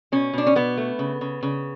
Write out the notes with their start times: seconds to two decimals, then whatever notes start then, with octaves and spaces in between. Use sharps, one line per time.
0.12 B2 C#4
0.33 B2 D4
0.47 C#4
0.55 B2 B3
0.77 A3
0.99 C#3
1.21 C#3
1.43 C#3